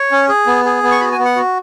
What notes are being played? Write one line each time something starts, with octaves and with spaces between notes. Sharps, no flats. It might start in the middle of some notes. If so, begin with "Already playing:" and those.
Already playing: C#5
C#4
G#4
B3
G#4
B3
C#6
F#4 B5
G#5
B3
F#5
F#4